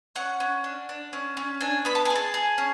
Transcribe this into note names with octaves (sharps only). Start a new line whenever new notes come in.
C#4 F#5
C#4
D4
D4
C#4
C#4
D4 G#5
B3 B5
A5
G#5
G#4
A5
G#4
C#4